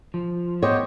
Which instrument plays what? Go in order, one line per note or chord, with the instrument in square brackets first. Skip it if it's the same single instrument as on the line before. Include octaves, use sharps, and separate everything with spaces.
[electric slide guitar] F3
[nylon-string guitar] B3 C#5 [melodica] G4 C5 D#5